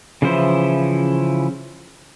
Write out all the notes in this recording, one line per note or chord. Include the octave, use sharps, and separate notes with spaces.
C#3 E3 F3 E4 C5